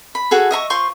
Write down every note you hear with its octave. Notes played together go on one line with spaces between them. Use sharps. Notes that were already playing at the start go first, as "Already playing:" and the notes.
B5
F#4 G#4 A4
D#5 E5 A#5 C#6
F4 C5 C6 C#6